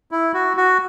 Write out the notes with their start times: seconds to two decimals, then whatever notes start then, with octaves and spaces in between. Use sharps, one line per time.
0.11 E4
0.34 F#4
0.57 F#4